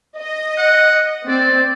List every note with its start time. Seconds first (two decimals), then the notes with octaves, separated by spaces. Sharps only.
0.18 D#5
0.58 F#5
1.28 C4 D5